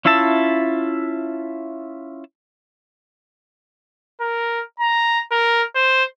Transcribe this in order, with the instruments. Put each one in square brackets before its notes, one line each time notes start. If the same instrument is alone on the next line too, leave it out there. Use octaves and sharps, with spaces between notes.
[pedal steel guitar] C#4 E4 F4 E5 A5
[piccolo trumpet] A#4
A#5
A#4
C5